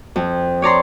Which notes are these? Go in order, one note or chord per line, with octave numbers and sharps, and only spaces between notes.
F2
C#5 D5 A#5 C6